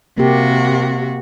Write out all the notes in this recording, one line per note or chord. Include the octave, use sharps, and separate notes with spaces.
C3 A#3 F#4 G4